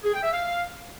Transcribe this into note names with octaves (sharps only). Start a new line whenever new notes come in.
G#4
G5
E5
F5